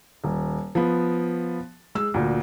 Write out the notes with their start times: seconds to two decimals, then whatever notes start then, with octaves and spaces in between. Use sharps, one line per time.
0.24 D#1
0.75 F3 B3
1.95 G#3 E6
2.14 D2 A#2